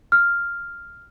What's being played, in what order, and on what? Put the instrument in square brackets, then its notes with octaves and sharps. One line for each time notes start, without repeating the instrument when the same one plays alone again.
[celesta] F6